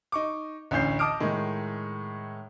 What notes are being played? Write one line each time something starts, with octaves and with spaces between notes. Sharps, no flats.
D#4 C#6 D6
A1 D2 C#4 G6 C7
D#5 A5 D6 D#6 F6 D7
A2 D#3 G#3